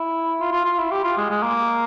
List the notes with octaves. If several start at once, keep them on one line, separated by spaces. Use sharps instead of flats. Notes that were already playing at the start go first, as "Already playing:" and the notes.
Already playing: E4
F4
F4
F4
E4
G4
F4
G#3
G#3
A#3